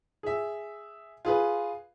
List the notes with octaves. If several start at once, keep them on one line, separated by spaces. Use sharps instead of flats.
G#4 E5
F4 G#4 B4